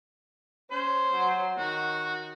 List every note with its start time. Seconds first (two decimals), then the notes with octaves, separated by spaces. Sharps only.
0.71 C#4 C5
1.15 F#3
1.57 D#3 F#4